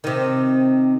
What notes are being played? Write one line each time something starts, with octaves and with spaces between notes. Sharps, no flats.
C3 D#3